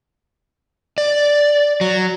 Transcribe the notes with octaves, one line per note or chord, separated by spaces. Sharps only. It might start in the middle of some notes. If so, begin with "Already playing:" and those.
D5
F#3